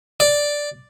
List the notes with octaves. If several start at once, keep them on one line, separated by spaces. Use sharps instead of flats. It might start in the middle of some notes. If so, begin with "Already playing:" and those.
D5